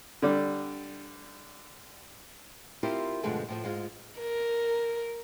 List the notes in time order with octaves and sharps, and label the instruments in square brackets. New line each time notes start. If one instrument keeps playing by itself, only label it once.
[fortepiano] D3 G3
[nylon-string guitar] C4 E4 F4 G4 A#4
G2 B2 D3 F3 G#3 A3
A2 F3 A3
G#2 G#3 F4
[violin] A#4